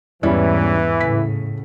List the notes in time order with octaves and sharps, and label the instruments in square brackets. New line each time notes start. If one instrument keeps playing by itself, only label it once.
[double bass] E2 G#2 [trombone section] E3 [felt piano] G3 C#4 E4
[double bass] A2 C#3 [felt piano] B6